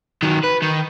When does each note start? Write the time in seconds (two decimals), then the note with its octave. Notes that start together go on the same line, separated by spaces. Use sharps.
0.23 D#3 F#3
0.43 B4
0.62 D#3